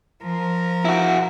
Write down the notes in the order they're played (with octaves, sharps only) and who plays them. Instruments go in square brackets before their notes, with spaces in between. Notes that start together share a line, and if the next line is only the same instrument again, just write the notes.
[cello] F3 A#4
[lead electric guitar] E4 F#4